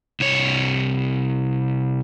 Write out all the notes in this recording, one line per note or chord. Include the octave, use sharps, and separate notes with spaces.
C2 C#5